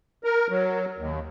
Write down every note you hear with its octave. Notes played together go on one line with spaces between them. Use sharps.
A#4
F#3
D#2